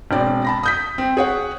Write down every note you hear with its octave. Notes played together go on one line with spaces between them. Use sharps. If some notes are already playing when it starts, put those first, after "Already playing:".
E1 C4 D5
A5 B5 A#6
D#6 G6 B6
C4
G#4 C#5 F#5